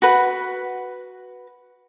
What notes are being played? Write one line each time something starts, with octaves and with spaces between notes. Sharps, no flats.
F#4 B4